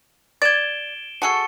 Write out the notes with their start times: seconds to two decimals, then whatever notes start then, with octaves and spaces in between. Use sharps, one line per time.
0.42 D5 G#6 A6 D7 E7 G7
1.22 F#4 G#4 A4 A5 C#6 C#7